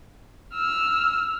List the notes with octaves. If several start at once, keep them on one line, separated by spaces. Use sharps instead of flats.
E6 F6